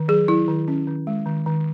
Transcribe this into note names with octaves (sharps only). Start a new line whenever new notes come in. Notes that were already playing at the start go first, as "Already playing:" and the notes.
Already playing: D#3
F#3 G#4
F#3 E4
D#3
C#4
D#3
G#3
D#3
D#3